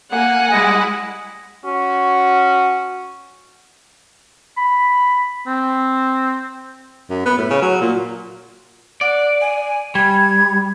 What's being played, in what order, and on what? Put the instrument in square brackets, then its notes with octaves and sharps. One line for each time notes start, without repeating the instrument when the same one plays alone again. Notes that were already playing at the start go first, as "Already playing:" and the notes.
[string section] A#3 [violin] F#5 G#5
[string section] G3 G#3 E4 [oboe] D#5
[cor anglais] C#4 [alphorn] F#4
[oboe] B5
C4
[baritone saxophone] F#2
B3
A2
C#3
F#3
A#2
[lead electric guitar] D5 [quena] F#5
[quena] G#5
[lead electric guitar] G3 [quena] G#6